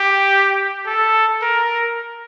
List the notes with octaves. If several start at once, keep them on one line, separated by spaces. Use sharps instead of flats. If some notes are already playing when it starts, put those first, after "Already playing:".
Already playing: G4
A4
A#4